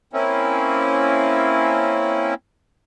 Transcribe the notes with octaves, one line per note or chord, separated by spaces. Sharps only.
A#3 C4 C#4 E4